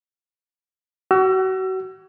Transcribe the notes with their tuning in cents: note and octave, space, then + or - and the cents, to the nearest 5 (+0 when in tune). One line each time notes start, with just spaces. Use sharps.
F#4 +30 E6 +35